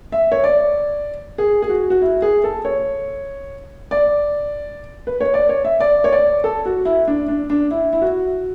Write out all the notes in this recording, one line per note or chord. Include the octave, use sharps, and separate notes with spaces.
E5
C#5
D5
G#4
G#4
F#4
F#4
E4
G#4
A4
C#5
D5
B4
C#5
D5
C#5
E5
D5
C#5
D5
A4
F#4
E4
D4
D4
D4
E4
E4
F#4